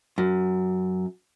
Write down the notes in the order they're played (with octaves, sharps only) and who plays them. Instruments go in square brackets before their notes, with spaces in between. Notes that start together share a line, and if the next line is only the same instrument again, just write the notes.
[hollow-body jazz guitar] F#2